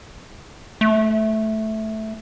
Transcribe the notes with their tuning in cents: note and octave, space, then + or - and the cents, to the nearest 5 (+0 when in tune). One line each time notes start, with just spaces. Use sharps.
A3 -10